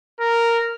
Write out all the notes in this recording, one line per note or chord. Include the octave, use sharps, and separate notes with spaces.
A#4